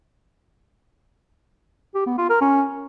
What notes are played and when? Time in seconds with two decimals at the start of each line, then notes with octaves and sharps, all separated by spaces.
1.95 G4
2.06 B3
2.18 F4
2.30 A#4
2.41 C#4